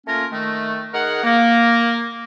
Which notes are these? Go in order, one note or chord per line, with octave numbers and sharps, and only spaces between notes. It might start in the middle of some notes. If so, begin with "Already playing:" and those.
A3 A#3 C#4 F4 A#4
D#3 A3
D#4 G#4 A#4 F#5
A#3